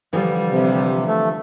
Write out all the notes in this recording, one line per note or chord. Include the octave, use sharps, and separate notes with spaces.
D3 E3 F3 G3
C3
A3